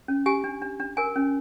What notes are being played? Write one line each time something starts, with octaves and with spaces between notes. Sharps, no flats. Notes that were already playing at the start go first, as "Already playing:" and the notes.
C#4
G4 G#5
D4
D4
D4
A#4 G#5
C#4